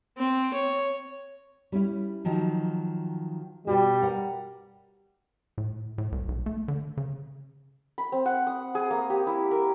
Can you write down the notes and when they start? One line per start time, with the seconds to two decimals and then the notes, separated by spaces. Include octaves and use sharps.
0.18 C4
0.54 C#5
1.72 G3 C#4 E4
2.25 D#3 F3 F#3
3.67 B2 G3 F#4
4.02 A#4 F#5
5.58 A2
5.98 A2
6.12 C2
6.28 B1
6.46 A3
6.68 D3
6.97 C#3
7.98 B5
8.12 C4
8.26 F#5
8.47 D#6
8.75 G#4
8.91 A#3
9.10 G4
9.27 E4
9.51 A#4